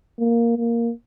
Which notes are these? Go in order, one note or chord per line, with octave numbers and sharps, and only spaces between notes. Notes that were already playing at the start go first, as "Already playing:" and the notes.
A#3
A#3